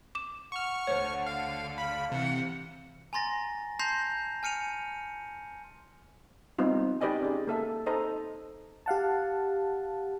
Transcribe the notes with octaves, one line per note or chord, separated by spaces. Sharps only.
D6 E7
F#5 C#6 F6
D2 D3 C5 C#5
F5
F5 B5
C3 E3 F#5
G#5 A#5 C6 A6 A#6
A5 C6 G6 A#6 C7 F7
G#5 F6 C#7 D#7 F7
G3 B3 C4 D#4 F4
D#4 G4 B4 D5 D#5 G#5
C#4 G#4
A#3 A4 E5
D#4 A4 C5 D#5 A#5
G4 F5 F#5 A5